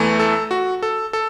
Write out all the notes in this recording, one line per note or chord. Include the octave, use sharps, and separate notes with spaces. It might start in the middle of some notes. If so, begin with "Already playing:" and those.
Already playing: E2 E3 A3
A4
F#4
A4
A4